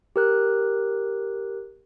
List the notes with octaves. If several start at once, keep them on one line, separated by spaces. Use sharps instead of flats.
G4 A#4 F#6